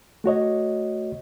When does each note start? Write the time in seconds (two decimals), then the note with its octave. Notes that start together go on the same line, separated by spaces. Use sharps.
0.24 A3 F#4 C#5 D#5